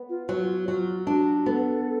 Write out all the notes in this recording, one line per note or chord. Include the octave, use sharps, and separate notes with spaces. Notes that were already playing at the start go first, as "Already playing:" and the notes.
Already playing: B3
F4
F#3 F4
F#3 F4
D4 F#4
B3 A4